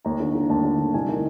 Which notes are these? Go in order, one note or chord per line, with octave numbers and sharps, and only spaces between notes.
D#2 A#5
D3
D3
D#2 A5
D3
D3
C2 G#5
D#3